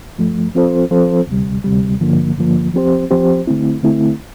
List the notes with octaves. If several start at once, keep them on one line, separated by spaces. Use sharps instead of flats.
G2 F3 A3
F3 C4 F4 A4 C5
F3 C4 F4 A4 C5
D2 C3 G3
D2 C3 G3
G2 D3 F3 A#3
G2 D3 F3 A#3
F3 C4 G4 C5
F3 C4 G4 C5
D3 A3 C4 E4
D3 A3 C4 E4